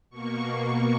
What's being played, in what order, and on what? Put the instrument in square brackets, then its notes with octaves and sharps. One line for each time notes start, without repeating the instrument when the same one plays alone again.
[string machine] B2 A#3 C#6